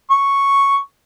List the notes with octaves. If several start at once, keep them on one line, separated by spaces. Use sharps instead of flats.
C#6